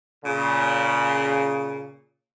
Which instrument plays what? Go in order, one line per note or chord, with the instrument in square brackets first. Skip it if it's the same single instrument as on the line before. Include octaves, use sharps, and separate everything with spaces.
[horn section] A#2 C#3